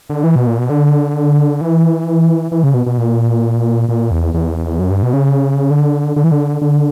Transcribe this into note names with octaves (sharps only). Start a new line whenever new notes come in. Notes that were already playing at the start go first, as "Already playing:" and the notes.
D3
E3
B2
A#2
B2
D3
E3
E3
C#3
B2
B2
A#2
A#2
E2
E2
F#2
G2
B2
C#3
D3
D3
E3
D3
D3